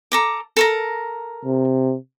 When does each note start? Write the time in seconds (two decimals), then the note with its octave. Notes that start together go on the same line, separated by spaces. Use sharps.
0.12 A4 A#5 D6
0.57 A4 A#4 A#5
1.45 C3